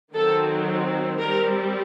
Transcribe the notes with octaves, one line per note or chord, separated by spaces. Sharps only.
D#3 F#3 C4 A4
G3 C4 A#4